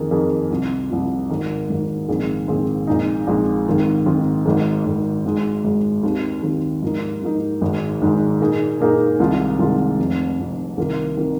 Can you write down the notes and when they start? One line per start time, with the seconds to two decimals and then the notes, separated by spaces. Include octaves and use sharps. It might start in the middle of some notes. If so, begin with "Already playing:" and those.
Already playing: F2 D#3 A#3 G#4
0.11 F2 D#3 A#3 G#4
0.50 C2 C3 F3
0.90 C2 C3 F3
1.30 G#1 G#2 D#3 A#3
1.69 G#1 G#2 D#3 A#3
2.08 A#1 G#2 D#3 C4 G#4
2.48 A#1 G#2 D#3 C4 G#4
2.87 A#1 A#2 G#3 C4 D#4
3.27 A#1 A#2 G#3 C4 D#4
3.67 G#2 D#3 C4 F4
4.06 G#2 D#3 C4 F4
4.46 G#1 G#2 D#3
4.85 G#1 G#2 D#3
5.25 G#1 G#2 G#3
5.64 G#1 G#2 G#3
6.03 D#2 D#3 C4
6.43 D#2 D#3 C4
6.82 G#2 F3 A#3 D#4
7.22 G#2 F3 A#3 D#4
7.61 G#1 G#2 D#3 G#3
8.01 G#1 G#2 D#3 G#3
8.40 A#2 A#3 D#4 G#4
8.80 A#2 A#3 D#4 G#4
9.20 C2 C3 D#3 G#3 F4
9.59 C2 C3 D#3 G#3 F4
9.99 F1 F2 C3
10.39 F1 F2 C3
10.77 C2 C3 D#3 A#3 F4
11.17 C3 D#3 A#3 F4